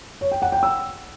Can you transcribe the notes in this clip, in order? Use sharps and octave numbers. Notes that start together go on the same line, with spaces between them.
C#5
G5
F#5
G5
E6